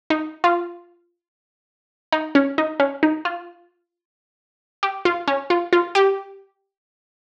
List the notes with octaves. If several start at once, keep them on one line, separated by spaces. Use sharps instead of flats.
D#4
F4
D#4
C#4
D#4
C#4
D#4
F4
G4
F4
C#4
F4
F4
G4